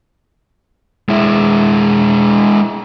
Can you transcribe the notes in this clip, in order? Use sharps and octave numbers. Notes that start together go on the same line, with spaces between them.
G#3 E4